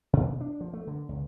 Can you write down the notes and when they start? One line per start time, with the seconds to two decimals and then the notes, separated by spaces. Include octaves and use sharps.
0.13 B2
0.41 D4
0.61 F3
0.73 A3
0.87 D3
1.09 C#2